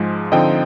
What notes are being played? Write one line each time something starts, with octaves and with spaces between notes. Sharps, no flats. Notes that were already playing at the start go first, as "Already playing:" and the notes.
Already playing: G#2 F3 G#3
D3 F3 C4 D#4 D#5 G5